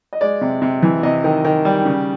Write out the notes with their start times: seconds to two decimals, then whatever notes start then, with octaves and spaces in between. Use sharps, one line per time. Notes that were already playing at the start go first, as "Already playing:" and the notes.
0.13 D#5
0.21 G#3 D5
0.41 C3
0.62 C3
0.83 E3
1.03 C3 D#5
1.24 D#3
1.45 D#3
1.65 G3
1.85 C#3